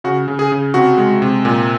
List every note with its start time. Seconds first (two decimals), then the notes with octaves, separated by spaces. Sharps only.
0.04 C#3 F#4
0.28 C#3
0.39 G#4
0.52 C#3
0.74 C3 F#4
0.98 G#3
1.22 C3
1.45 A#2